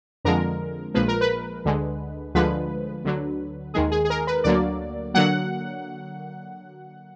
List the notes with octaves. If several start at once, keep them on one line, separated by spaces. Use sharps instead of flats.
F2 D3 F3 G#3 A#4
A#1 A#2 F3 G#3 B4
A#4
B4
D2 D3 G#3
D2 D3 F3 G#3 B4
D2 D3 F#3
D#2 D#3 G#3 G#4
G#4
G#4
A#4
B4
D2 D3 F#3 A#3 D5
D3 F#3 A#3 F#5